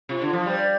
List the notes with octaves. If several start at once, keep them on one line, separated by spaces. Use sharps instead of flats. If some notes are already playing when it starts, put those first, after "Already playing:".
C3 F4
D3 F4
F3
G3 C5
D5